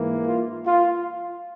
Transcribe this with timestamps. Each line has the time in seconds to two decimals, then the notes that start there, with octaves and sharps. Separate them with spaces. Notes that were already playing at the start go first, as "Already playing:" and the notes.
Already playing: G#2 E3 A#3
0.26 F4
0.66 F4